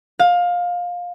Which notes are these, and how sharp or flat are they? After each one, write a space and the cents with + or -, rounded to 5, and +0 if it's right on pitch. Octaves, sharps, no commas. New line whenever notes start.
F5 +20